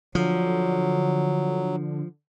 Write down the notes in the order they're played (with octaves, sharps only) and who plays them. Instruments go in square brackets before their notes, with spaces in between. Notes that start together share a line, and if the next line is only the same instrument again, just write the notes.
[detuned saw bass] D3 [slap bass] F3 [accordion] F#3